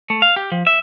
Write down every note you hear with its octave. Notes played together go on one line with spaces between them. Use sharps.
A3
F5
G4
F3
E5